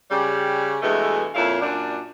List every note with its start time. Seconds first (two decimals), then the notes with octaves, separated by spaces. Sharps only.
0.11 C#3 G3
0.82 G2 B2 E3 G#3 A3
1.35 F2 A#2 C#4 E4 F5
1.61 F#2 A#2 D4